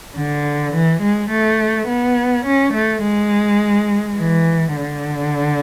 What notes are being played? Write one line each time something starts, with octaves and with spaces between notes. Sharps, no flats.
D3
E3
G#3
A3
B3
C#4
A3
G#3
E3
D3